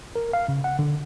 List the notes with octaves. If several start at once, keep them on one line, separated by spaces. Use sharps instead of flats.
A#4
F5
C#3
F#5
D3